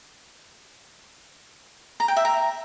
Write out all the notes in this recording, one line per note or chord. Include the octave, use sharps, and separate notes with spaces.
A#5
G5
E5
A#5